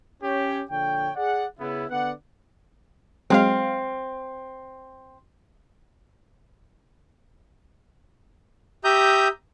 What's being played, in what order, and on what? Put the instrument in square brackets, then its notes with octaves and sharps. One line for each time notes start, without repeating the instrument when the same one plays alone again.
[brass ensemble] C#4 G4 C#5
A#1 D3 C#5 G5
G#4 D5 F#5
C#3 B3 E4
D3 B3 D5 F#5
[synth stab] F#3 G#3 F5 [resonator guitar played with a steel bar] C4
[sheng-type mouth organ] G4 E5 A#5 D#6 G6